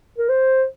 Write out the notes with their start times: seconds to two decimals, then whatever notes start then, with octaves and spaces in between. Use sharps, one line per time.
0.19 A#4
0.29 C5